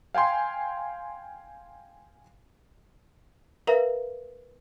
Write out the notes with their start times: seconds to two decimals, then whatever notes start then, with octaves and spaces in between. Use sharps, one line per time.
0.14 F5 G5 G#5 C6
3.67 A#4 B4 E5 F5 A#5